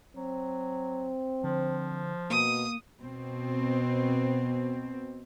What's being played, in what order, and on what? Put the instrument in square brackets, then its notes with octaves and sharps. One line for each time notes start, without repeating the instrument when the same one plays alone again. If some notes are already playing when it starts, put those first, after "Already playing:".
[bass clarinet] F#3 [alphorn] C4
[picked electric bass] D3 [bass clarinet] F3
[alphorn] B2 [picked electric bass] A#3 [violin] D#6
[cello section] B2 C4